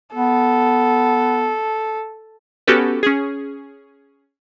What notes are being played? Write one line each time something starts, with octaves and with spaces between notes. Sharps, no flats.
B3 A4
B3 C#4 F#4 G4 A4 B4
C#4 G#4